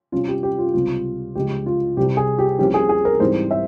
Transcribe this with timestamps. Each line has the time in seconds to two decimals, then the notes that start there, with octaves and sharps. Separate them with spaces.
0.12 C3 G3 C#4 F4
0.28 G4
0.43 G4
0.59 F4
0.74 C#2 C3 G3 C4 F4
1.35 C#2 C#3 F3 G#3 G4
1.66 F4
1.97 C2 C3 G3 G4
2.17 G#4
2.38 G4
2.59 C2 C3 F3 A#3 C#4 G4
2.74 G#4
2.89 G#4
3.05 A#4
3.20 G#2 E3 G3 C4 C5
3.51 E5